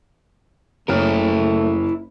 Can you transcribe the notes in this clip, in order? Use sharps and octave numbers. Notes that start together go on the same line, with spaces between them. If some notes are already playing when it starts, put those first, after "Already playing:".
F#1 A3 E4 A#4 C#5 F6